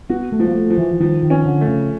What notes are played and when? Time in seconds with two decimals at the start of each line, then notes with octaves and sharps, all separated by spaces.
0.09 B3 F#4
0.32 A3
0.40 F3
0.48 A#3
0.55 A3
0.70 F3
0.78 E3
0.92 E3
1.00 D#3 F3
1.23 D#3
1.30 C#4
1.46 D3
1.61 A3
1.68 C#3